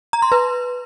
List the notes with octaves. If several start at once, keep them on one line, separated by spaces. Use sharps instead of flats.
A#5
C6
B4